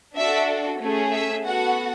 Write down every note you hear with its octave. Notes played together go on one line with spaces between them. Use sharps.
D4 F#4 A4 E5
A3 C#4 G#4
E5
B3 F#4 A4 F#5